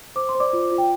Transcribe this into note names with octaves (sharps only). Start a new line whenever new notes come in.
C5 D6
C6
C5
D5 D6
F4
F4
G5